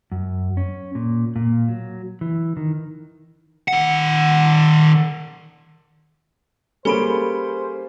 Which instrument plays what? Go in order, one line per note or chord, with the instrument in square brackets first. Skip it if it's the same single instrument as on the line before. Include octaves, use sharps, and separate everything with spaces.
[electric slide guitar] F#2
C#4
A#2
A#2
F#3
E3
D#3
[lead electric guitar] D#3 F#5
[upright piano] G3 A#3 [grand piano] C#4 G#4 D7 [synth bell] A4 B5 [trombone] C5